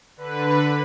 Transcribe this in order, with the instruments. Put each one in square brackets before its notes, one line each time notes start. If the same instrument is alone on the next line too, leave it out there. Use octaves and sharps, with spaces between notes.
[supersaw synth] D3 B4